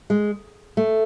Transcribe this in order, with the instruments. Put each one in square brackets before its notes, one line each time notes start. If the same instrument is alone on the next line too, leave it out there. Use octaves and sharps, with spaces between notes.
[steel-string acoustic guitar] G#3
A3